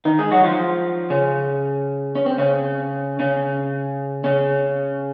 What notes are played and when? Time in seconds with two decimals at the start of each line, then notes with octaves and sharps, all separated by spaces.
0.05 D#3 D#4
0.19 G#3 G#4
0.32 F#3 F#4
0.44 F3 F4
1.10 C#3 C#4
2.15 C#4
2.26 C4
2.38 C#3 C#4
3.19 C#3 C#4
4.24 C#3 C#4